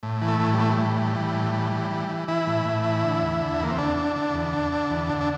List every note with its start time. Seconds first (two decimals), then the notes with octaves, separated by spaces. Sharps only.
0.03 A2
0.22 E3
0.28 A3
0.40 A2
0.53 G3
0.59 E3 A3
0.70 G3
0.78 A2
0.97 E3
1.15 E3
1.34 A2
1.53 E3
1.72 E3
1.91 E3
2.09 E3
2.28 E3 E4
2.47 A2
2.66 A2
2.84 E3
3.03 D3
3.22 E2
3.41 D3
3.60 E2 A#3
3.71 C4
3.78 D3 D4
3.97 D3
4.16 D3
4.34 E2
4.53 D3
4.72 D3
4.90 E2
5.10 D3
5.21 D4